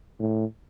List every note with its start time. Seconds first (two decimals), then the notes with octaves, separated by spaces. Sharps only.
0.20 A2